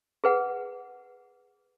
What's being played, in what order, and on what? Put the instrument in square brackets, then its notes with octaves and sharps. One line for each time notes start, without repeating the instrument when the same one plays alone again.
[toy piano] G#4 B4 F#5